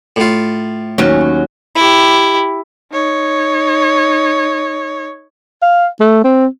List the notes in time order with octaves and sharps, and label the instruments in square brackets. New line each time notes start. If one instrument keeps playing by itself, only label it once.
[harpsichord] A2 F4
[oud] D#2 F#3 C#4
[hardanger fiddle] E4 G4
[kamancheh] D#4 C#5
[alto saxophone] F5
A3
C4